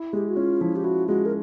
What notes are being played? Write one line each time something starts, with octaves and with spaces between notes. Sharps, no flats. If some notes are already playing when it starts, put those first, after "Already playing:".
Already playing: E4
G#3 G4
F#4
C#4 F4
F3 E4
G4
E4 F#4
G#3 F#4
A#4